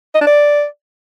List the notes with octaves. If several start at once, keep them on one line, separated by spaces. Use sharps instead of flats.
D#5
D4
D5